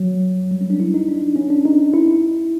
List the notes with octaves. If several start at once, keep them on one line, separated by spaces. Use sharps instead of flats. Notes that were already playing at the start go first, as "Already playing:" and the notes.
Already playing: F#3
G3
C#4
D4
E4
D#4
D4
C#4
D4
D#4
E4